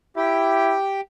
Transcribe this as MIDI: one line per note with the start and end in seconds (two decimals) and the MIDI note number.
0.16 0.76 64
0.16 1.01 67